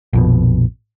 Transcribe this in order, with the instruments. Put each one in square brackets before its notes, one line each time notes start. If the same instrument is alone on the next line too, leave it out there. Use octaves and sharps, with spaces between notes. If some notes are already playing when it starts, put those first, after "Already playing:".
[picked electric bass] A#1 F2 B2